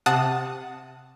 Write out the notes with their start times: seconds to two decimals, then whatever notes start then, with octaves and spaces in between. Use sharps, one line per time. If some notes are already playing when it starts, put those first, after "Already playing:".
0.06 C3 F#5 A5 D#6